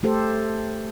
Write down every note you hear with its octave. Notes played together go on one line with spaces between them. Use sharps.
A3 G4 A4 C5